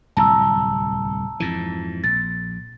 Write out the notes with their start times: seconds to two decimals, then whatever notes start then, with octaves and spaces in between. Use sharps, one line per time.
0.17 D1 C2 A5 A#5 E6
1.40 F2 G#2 E3
2.04 A#1 A6